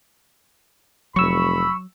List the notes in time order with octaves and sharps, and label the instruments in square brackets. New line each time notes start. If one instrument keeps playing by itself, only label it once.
[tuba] F1 [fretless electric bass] F#3 [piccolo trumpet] B5 [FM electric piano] C#6 E6